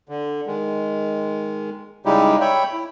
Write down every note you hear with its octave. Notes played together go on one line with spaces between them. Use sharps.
D3
D#3 G#3
C#3 G3 G#3 D#4 E4 G4
C#5 E5 G5 B5
E4